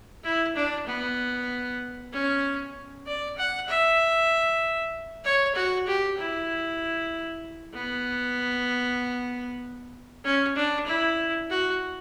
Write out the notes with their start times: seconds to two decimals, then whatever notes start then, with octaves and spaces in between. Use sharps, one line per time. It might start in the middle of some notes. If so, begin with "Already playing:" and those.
0.24 E4
0.56 D4
0.87 B3
2.12 C#4
3.06 D5
3.37 F#5
3.68 E5
5.25 C#5
5.56 F#4
5.88 G4
6.18 E4
7.74 B3
10.24 C#4
10.56 D4
10.87 E4
11.50 F#4